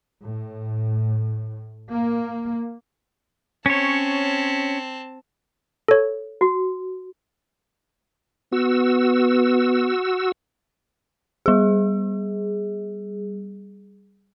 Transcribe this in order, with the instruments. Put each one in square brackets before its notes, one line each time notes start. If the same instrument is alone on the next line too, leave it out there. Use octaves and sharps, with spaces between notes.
[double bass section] A2
A#3
[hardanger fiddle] C4 A5 [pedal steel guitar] C#4 C#5
[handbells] A4 C#5
[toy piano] F#4
[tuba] B3 [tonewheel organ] F#4 E6
[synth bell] G3 G#4